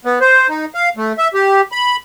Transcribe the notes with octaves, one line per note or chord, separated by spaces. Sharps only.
B3
C5
D#4
F5
A3
E5
G4
B5